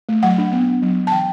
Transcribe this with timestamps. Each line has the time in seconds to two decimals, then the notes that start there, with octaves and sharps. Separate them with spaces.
0.09 A3
0.23 F#3 F#5
0.38 D4
0.52 B3
0.67 B3
0.82 F#3
0.97 F#3
1.07 A5
1.12 E3 G5